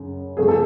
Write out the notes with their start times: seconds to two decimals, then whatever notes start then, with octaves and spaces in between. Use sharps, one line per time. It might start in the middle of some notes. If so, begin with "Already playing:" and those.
Already playing: F#2 C#3
0.37 F2 C#3 F3 A3 G#4
0.48 A4